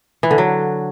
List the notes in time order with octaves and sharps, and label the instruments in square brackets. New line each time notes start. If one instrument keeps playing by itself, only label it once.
[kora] E3
D3
F#3